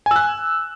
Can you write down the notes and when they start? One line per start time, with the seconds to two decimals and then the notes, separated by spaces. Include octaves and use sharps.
0.06 G#5
0.11 E6
0.16 F#6